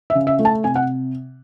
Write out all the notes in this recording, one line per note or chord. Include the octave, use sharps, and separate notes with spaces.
E5
C#3
E5
A3
A5
C3 G#5
F#5